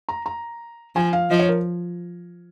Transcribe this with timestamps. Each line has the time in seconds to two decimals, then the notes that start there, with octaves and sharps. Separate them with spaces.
0.09 A#5
0.26 A#5
0.96 F3 G#5
1.13 F5
1.31 F3 D#5
1.39 C#5
1.49 A#4